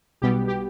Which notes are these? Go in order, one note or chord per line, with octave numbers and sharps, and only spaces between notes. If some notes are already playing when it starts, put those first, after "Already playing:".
B1 B2 G3 B3 G4
G4